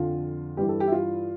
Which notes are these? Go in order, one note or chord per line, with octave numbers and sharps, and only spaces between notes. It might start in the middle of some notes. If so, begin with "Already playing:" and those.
Already playing: F2 D3 F3 F4
G2 E3 G4
A4
G4
E4
F4